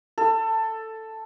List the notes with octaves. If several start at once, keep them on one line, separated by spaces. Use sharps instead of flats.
A4